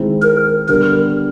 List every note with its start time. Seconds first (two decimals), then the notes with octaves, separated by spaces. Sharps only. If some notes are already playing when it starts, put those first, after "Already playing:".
Already playing: D#3 G#3 C4 E4
0.23 A#4
0.69 D3 G3 B3 A#4